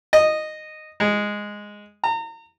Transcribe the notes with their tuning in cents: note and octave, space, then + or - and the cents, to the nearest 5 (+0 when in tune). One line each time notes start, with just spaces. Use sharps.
D#5 -10
G#3 -5
A#5 -35